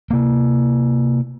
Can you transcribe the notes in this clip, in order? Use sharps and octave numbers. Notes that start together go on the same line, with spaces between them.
C3 A#3